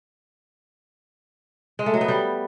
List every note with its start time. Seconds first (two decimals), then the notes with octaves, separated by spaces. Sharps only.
1.79 G#3
1.86 A3
1.94 F#3
2.01 B3
2.08 G3